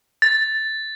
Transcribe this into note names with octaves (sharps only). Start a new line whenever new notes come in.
A6